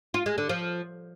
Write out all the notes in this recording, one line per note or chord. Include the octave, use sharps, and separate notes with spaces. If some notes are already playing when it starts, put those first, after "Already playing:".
F4
G#3
D3
F3